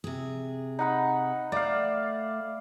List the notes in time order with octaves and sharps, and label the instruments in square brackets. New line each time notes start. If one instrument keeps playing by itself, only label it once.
[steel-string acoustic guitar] C3 G#4
[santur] D#4 F#5 B5
[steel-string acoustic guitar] A3 [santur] D5 F5